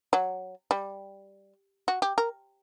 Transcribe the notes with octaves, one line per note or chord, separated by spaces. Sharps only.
F#3
G3
F#4
G4
A#4